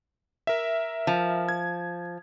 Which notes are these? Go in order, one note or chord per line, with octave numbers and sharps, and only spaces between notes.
A#4 E5
F3
G#6